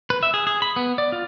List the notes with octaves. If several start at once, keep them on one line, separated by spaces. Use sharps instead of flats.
B4
E5
G#4
G#4
B5
B3
D5
F4